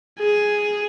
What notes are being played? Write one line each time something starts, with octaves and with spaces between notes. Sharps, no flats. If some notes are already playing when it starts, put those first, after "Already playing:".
G#4